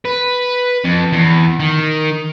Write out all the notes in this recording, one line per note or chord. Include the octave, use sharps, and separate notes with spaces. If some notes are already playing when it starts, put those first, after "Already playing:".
B4
F2
E2
D#3